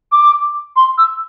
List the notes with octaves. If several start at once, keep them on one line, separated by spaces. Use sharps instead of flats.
D6
C6
E6